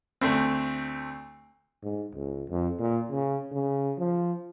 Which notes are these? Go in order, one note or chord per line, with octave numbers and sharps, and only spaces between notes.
D2 A3 C4
G#2
C#2
F2
A#2
C#3
C#3
F3